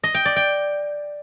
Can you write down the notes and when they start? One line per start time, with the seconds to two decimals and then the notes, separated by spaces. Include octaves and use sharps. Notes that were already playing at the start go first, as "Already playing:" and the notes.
0.04 D#5
0.14 G5
0.25 D5
0.36 G5